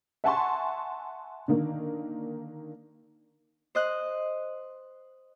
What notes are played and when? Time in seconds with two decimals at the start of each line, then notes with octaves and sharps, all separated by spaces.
0.24 E5 F#5 G#5 A5 C6 C#6
1.48 D3 D#3 A#3
3.75 C5 D#5 F#6